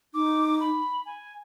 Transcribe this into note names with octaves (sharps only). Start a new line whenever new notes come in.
D#4 D6
B5
G#5